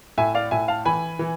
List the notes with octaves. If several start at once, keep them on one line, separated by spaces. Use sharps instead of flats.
A2 E5 G#5
D5 F5
A2 E5 G#5
F5 A5
E3 G#5 B5
E3